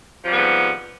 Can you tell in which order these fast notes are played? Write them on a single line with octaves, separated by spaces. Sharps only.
F3 C3 G3 B3 G#2